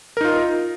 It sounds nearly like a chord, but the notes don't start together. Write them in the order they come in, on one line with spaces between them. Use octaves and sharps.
A#4 D#4 F4